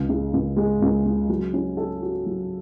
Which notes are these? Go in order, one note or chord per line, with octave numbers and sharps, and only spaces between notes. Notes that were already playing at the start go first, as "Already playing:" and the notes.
Already playing: C#2
C#3
C#2
G#3
C#2
C#3
F#3
C#4
A4
F#4
F#3